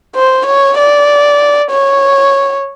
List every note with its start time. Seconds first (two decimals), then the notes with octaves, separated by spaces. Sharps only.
0.15 C5
0.46 C#5
0.78 D5
1.71 C#5